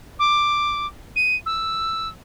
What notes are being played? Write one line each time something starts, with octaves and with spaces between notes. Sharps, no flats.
D6
D#7
E6